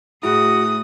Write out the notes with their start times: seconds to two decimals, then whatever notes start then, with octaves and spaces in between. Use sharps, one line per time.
0.23 A2 E4 F#4 G#4 D#6